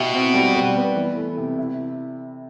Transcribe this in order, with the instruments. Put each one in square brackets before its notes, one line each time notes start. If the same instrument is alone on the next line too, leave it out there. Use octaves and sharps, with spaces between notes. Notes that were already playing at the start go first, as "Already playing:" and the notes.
Already playing: [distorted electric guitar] B2 [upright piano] E4 G4
[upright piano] C4
G3
G3
B3
E3
A3
C3
E4